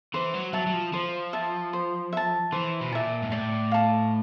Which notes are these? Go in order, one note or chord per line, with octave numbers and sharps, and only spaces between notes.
E3 C5
F#3
F#3 E5 A5
F#3
F3
F3 C5
E5 A5
C5
E5 A5
E3 C5
B2
A#2 E5 A5
G#2
A2 D5
F5 A5 D6